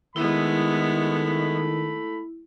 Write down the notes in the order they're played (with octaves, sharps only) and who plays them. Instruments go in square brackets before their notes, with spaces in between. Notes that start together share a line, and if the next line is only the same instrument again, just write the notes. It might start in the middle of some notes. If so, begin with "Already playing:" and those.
[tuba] D#3 [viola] G#3 B3 [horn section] A3 B5 [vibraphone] E4